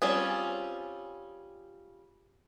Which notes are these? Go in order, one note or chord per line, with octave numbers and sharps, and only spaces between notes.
G3 C4 C#4 F4 G#4